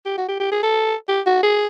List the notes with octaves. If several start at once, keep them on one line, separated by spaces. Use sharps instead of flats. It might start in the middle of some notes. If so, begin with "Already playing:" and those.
G4
F#4
G4
G4
G#4
A4
G4
F#4
G#4